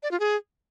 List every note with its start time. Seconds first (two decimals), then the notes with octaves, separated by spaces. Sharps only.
0.03 D5
0.11 F4
0.20 G#4